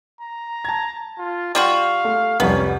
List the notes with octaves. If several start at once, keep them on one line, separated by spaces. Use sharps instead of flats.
A#5
A5 G#6
F4
G3 F4 F#4 F5
A3
C2 F2 G3 B3 C#4